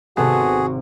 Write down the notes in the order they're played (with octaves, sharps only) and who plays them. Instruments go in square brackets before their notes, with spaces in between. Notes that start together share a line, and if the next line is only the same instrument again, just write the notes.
[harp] G#1 C3 C6 [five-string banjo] B3 A4 [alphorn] F#4 [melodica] G#4